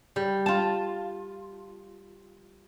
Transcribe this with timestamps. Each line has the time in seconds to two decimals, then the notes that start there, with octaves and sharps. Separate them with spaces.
0.16 G3
0.46 F4 A5